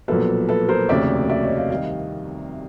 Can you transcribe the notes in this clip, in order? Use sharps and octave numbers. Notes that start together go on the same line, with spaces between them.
B1 A#2 F3 A#3 A4 B4
A4 B4
A#4 C5
F1 D#2 C#3 F#3 A3 D5 E5
D5 E5
C#5 D#5
D#5 F5
C2 C3 D#3 D#5 F5